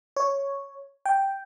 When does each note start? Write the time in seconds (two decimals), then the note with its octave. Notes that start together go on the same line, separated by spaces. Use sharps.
0.16 C#5
1.06 G5